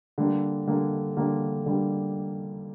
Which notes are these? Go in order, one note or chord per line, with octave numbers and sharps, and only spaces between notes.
D3 G3 A#3
D3 G3 A#3
D3 G3 A#3
D3 G3 A#3